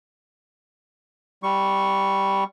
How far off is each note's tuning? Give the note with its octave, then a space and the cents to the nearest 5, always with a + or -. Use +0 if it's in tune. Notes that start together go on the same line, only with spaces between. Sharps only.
G3 +0 C#6 +0